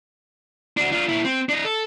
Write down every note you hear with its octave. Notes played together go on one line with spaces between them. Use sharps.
D4 F#4
D4 F4
A#2 E4
C4
D4 D#5
A4